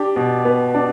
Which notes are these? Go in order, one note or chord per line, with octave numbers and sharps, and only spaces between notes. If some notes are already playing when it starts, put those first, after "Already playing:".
Already playing: D4 G4
B2
B3
D4